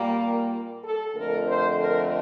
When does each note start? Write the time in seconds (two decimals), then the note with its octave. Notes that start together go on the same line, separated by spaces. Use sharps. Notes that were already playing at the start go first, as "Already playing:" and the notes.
Already playing: A#2 G3 A#3
0.21 A#4
0.83 A4
1.15 F2 D3 A3 A#4
1.47 C5
1.78 A#4